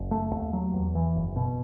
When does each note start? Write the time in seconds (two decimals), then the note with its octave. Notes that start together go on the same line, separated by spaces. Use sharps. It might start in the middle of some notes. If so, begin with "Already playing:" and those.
Already playing: F#1
0.11 A3
0.33 D#2
0.53 F#3
0.73 E2
0.95 E3
1.16 F#1
1.36 B2